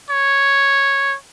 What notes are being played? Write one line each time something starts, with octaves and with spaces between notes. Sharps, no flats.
C#5